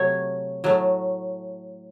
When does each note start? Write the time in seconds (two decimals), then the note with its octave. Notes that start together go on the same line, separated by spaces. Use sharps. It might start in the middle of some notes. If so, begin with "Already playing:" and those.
Already playing: C3 F#3 A3 C#5
0.64 A2 F#3 A3